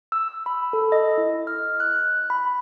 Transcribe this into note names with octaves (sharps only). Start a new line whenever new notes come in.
E6
B5
A4
D#5
E4
F6
F#6
B5